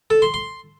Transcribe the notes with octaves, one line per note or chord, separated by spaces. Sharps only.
A4
C6
C6